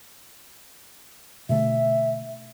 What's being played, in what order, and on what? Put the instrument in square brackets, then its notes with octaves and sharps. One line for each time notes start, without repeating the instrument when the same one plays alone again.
[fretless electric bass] B2 D3 A3 [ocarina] E5